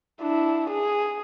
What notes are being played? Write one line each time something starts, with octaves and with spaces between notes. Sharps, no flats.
D4 E4
G#4